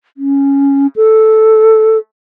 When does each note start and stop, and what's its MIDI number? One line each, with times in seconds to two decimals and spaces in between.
0.17 0.87 61
0.96 1.98 69